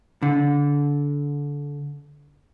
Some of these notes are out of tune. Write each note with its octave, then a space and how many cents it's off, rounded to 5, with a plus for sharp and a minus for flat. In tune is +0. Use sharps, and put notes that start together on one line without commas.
D3 -25